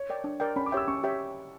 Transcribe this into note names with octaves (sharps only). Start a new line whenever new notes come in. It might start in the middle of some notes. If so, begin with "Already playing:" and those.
Already playing: C#5
A#4 D5 G5
D4
A#4 D5 G5
C#4 B5
D6
G4 C#5 E5 G5 E6
C#4 C#6
G4 C#5 E5 G5